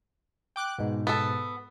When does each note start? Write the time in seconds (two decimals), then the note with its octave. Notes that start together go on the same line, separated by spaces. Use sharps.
0.56 G5 D6 F#6
0.78 G#2 B2
1.07 B3 A4